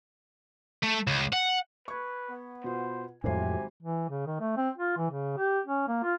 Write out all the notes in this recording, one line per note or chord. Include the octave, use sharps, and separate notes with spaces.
A3
C#2
F#5
B4 C#6 G#6
B3
B2 F4 C5
G#1 F2 A2 C3 F#3 G#5 C7
E3
C#3
D#3
A3
C4
F4
E3
C#3
G4
C#4
A#3
F4